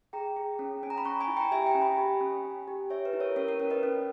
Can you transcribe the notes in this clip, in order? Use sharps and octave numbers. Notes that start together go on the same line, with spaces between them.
G#4 G5 A#5
G#4
C#4
C#4 G#5
A#5
B5
C#4 A#5 C#6
G#5 B5
E4
G5 A#5
G4 E5 G#5
G5 A#5
C#4
G#5 B5
G4
C#4
C#4
G4
G4 C#5 E5
B4
E4
A#4 C#5
C#4 A#4 C#5
A#4
C#4 A#4
B4 D#5
C#4